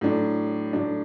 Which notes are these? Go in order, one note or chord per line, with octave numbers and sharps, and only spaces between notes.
A2 F#3 D4
A2 F#3 D4